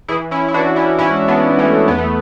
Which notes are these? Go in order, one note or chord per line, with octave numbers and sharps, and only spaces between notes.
E3 E4 G#4
C#4 E4
E4
E3 D4 F#4
C#4 E4
G#2 C#4 E4
B3 D4
G#2
A3 C#4
E2 B3
A3